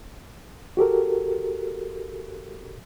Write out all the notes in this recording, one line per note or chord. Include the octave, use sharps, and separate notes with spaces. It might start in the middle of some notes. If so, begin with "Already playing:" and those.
F#4 G4 A4 A#4